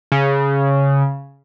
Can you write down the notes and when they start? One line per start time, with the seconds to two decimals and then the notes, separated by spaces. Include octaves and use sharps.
0.12 C#3